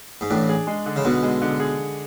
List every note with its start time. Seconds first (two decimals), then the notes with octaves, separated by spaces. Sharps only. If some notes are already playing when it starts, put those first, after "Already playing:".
0.21 G#2
0.30 A1 A2 D4
0.49 G#4
0.67 G#3
0.86 D3
0.96 C#3
1.04 B1 B2 D3
1.23 G#3
1.42 D3
1.60 G#4